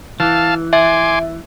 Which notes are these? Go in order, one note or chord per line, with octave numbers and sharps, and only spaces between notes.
E3 F5 A5
E5 G#5 C6 D6